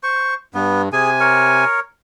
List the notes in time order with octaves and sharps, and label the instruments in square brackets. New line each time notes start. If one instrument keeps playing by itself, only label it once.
[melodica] C5 C#6
[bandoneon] G2 [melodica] B3
[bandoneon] C3 G#5 [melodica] G#4
[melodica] A#4 C#5